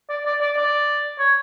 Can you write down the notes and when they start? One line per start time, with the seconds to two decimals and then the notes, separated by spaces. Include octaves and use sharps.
0.09 D5
0.26 D5
0.41 D5
0.57 D5
1.19 C#5